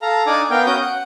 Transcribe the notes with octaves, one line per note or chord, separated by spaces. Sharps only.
A4 F5 A#5
D4 D#4 D5 G#5 D6
B3 A#4 F5 G5
C#4 F#4 D#6 G6
F#5